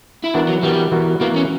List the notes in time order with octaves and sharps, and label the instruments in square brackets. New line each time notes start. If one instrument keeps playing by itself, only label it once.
[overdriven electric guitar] E4
[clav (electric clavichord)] E3 B3 F#4 A#4 [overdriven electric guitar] D4
[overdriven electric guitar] F#3
[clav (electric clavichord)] E3 B3 F#4 A#4 [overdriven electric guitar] G3
[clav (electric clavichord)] E3 B3 F#4 A#4
[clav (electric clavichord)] E3 B3 F#4 A#4 [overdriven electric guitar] A#3
[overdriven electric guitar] C#4